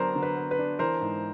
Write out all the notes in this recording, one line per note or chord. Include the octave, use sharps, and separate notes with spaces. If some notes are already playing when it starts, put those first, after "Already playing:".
Already playing: D3 F#3 B3 D4 A#4 C5
D3
B4
B3
B4
D4
E3 A#4 C5
G#2